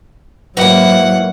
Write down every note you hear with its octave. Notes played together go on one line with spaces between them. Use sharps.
G#2 E3 F#3 A#3 F#5